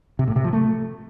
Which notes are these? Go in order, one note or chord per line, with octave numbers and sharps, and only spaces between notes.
C3
A2
C3
F3
A3